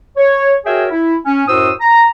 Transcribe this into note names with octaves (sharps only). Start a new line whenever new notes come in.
C#5
F#4 G#4 A#4 C#5 E5 G5
E4
C#4
F#2 A2 F#4 C5 D#6 E6
A#5